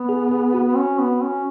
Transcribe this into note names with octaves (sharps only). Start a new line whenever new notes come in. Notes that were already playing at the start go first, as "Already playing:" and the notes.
Already playing: B3
G#4
G#4
F#4
B3
C#4
B3
C#4